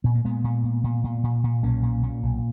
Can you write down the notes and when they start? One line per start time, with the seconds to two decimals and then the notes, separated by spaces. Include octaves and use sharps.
0.04 A#2 B3
0.15 A#3
0.24 A#2 G#3 B3
0.44 A#2
0.64 A#2
0.84 A#2
1.04 A#2
1.24 A#2
1.44 A#2
1.63 B1 A#3 C#4
1.83 A#2
2.03 A#2
2.23 B1